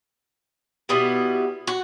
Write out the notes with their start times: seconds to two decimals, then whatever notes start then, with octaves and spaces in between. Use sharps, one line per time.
0.89 B2 G3 B3 E4
1.67 F#4